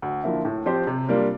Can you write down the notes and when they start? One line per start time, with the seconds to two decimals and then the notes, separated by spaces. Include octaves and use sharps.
0.02 D2
0.23 D3 F3 A#3 E4
0.45 A2
0.66 F3 C4 G4 C5
0.87 C3
1.09 G3 A#3 D4 F4